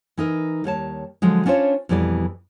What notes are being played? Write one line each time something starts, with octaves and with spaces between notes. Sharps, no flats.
E3 D#4 A#4
D#2 G3 C#5 A5
D3 F3 F#3 G#3
C#4 D4 F4 C5 C#5
F2 B2 E3 G3 D5